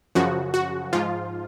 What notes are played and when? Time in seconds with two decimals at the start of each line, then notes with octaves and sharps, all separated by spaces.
0.15 F#2 C#3 F3 F#4
0.54 F#4
0.93 G#2 F3 F4